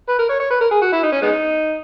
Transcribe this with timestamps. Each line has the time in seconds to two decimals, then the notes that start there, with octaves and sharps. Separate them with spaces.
0.09 B4
0.19 A#4
0.30 C#5
0.40 C#5
0.50 B4
0.61 A#4
0.71 G#4
0.82 F#4
0.93 E4
1.03 D#4
1.12 C#4
1.22 G#3 B3 D#4